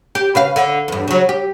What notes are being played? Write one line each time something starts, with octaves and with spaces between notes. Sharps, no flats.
G4
C#3 B4 F5
D3
E2 G2
C#3 F#3
G4